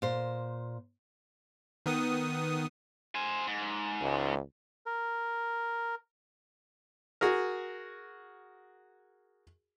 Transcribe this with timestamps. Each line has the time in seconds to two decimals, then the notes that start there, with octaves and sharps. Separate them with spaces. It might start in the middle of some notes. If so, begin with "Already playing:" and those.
0.02 A#2 C5
1.86 D#3 B3 D#6
3.15 C5 G#5
3.47 G#2
4.01 C#2
4.86 A#4
7.21 F#4 G#4 A#4